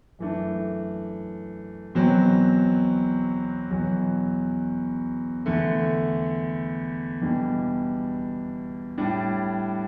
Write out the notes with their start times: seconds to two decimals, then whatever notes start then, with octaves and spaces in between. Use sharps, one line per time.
0.19 F#2 E3 A3 D4
1.95 E2 B2 F#3 C4
3.71 E2 B2 F#3
5.46 E2 D3 A3
7.21 E2 B2 G3 D4
8.97 A2 G3 D4